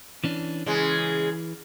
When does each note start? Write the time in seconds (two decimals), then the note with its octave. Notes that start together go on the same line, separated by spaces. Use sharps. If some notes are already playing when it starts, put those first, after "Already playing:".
0.24 E3 C#4 D4
0.66 C#3 E3 G#3